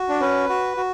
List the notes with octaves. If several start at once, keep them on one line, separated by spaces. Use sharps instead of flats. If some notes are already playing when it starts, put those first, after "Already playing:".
Already playing: F#4
D4
C#4 B4
F#4
F#4